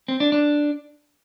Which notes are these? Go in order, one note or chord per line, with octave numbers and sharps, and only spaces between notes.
C4
D4
D4